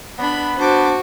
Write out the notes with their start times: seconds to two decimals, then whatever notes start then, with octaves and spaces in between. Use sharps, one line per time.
0.18 B3 D4 B5
0.58 D4 F#4 C5 D6